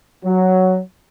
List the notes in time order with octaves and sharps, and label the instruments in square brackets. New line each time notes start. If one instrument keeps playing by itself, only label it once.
[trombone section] F#3